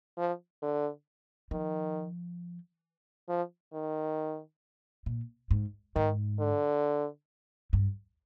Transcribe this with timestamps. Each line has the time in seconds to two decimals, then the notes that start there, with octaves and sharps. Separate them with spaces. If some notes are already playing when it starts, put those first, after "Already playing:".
0.18 F3
0.62 D3
1.51 D#3 F3
3.29 F3
3.73 D#3
5.06 A#2
5.51 G#2
5.95 G#2 D#3
6.40 D3
7.73 G2